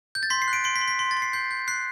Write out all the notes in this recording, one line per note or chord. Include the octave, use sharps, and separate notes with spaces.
G6
A6
C6 B6
C7
F#6
D7
C6 D7
B6
C6
B6
C6
A6
C6
C7
G6 C7
G6
F#6 C7